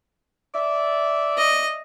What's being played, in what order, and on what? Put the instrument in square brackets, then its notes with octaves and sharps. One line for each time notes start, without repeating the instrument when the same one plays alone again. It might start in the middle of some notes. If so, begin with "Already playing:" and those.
[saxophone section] D5 E5
[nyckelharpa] D#5